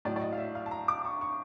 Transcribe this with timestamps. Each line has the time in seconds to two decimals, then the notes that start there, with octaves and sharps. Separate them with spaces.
0.05 A2 F#3 D5
0.16 D5
0.21 D#5
0.33 F5
0.38 E5
0.55 F5
0.66 A5
0.71 A#5
0.88 D6
1.05 C#6
1.21 C#6